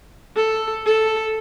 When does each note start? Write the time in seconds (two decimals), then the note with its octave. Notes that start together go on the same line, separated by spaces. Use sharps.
0.36 A4
0.86 A4